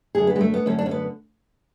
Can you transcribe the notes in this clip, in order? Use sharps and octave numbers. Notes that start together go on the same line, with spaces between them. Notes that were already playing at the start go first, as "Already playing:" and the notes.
F#2 D3 G#4
B3
G#3
A3
B3
F#2 D3 C#4
D4
C#4
B3